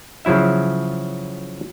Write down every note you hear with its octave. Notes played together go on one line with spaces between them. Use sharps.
C#3 F3 F#3 E4 E5